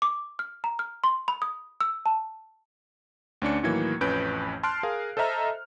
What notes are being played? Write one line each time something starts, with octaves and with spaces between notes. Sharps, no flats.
D6
F6
A#5
F6
C6
B5
D#6
E6
A5
D2 C#4 D4 C#7
A2 D#3 E3 F#3 A#3 G#6
A1 F2 C#4 B4 G6 D7
A5 C6 F6 F#6 C7 D7
G#4 A#4 F5
A4 C5 D#5 E5 A#5 F6